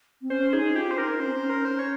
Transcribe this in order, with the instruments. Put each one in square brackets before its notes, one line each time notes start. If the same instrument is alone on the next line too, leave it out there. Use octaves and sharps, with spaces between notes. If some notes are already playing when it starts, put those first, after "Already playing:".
[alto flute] C4
[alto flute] C#4 [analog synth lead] C5
[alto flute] D#4 [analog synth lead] G#4
[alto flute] F4 [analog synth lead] G4
[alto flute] C#4 [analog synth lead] C5
[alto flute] D#4 [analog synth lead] A#4
[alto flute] C#4 [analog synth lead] C5
[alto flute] C4
[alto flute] C#4 [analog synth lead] C5
[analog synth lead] A#4
C5
C#5